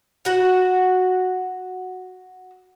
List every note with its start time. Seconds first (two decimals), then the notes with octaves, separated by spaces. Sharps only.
0.25 F#4 F#5